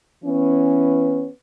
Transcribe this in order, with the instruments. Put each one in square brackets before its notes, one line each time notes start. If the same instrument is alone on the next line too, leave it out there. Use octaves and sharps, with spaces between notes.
[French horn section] E3 B3 C#4